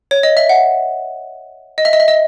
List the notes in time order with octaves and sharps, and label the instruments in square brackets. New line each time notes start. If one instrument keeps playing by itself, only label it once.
[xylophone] C#5
D#5
E5
F#5
D#5
E5
D#5
E5
D#5